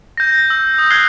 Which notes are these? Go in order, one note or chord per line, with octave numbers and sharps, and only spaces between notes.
G6 A#6
E6
D#6
F#6 G#6 C7 G7